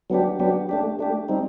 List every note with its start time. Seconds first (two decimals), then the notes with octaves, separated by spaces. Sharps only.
0.10 F#3 B3 D4 G4
0.39 F#3 B3 D4 G4
0.69 A3 D4 G4
0.99 A3 D4 G4
1.29 G3 C4 D#4